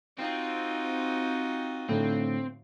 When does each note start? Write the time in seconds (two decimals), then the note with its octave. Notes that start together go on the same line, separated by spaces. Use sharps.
0.19 C4 D#4 F4 F#4
1.89 A2 D3 C4